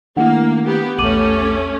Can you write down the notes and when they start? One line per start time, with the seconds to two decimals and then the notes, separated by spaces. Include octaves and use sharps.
0.17 D#3 A3 A#3 D4 E4 F#5
0.65 B3 G4
0.99 A#1 E2 A3 C#4 D6 D#7 F#7